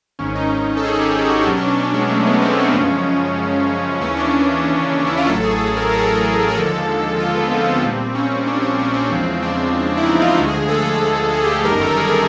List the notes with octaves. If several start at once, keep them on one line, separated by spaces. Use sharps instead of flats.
G#1 G#2 D#3 C#4
D#4
A4
G#4
G4
G#4
F#4
G4
D4
B1 B2 F#3 C#4
D4
C#4
D4
G#3
A3
B3
C4
C#4
F#2 C#3 F3 G#3
D#2 C#3 E3 C#4
D4
E4
F4
A1 A2 F#3 A4
G#4
A4
A#4
A4
A#4
A4
A#4
D#2 D3 F3 G#3 A4
F4
B3
C4
A#1 A#2 G3
C#4
C#4
D4
D4
C#4
C4
E2 C#3 F3 G#3
D4
E4
D#4
F4
D2 D3 F3 G#3 F#4
G#4
A4
G#4
G4
G#4
G1 F#2 D#3 G3 A#4
A4
G#4